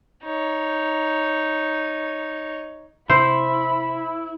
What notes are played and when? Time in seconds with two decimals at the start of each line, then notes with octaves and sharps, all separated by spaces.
0.23 D#4 C#5
3.10 C3 E4 C5 B5